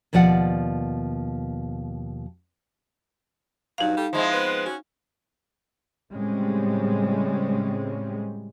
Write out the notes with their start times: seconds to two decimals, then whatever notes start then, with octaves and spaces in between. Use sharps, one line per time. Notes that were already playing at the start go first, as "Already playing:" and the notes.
0.13 D#2 B2 F3 D5 F#5
3.78 G2 B2 F#3 D#4 F5
3.96 G3 G4 A4
4.13 F3 G#3 C4 E4
4.32 B3 B4
4.65 C#4 F#4
6.12 A2 C#3 G3 G#3 C4 C#4